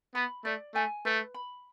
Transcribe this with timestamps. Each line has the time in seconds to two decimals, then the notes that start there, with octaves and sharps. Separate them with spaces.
0.15 B3 B5
0.45 A3 D5
0.74 A3 G#5
1.05 A3 B4
1.34 B5